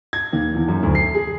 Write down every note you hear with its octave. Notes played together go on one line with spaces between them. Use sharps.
G#6
D#2
E2
F#2
D2
C7
G#4